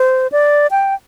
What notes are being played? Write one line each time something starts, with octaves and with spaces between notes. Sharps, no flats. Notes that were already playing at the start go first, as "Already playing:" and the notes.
Already playing: C5
D5
G5